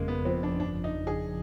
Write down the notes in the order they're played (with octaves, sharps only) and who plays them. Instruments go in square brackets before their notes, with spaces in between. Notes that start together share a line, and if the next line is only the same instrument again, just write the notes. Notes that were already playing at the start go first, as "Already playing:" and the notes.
Already playing: [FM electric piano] G1 F2 C#3 [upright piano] G#3 A#3
[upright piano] B3
[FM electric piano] F3 [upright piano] C4
[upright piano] D4
[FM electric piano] G1 [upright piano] D4
[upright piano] D#4
[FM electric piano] F2
[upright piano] G#4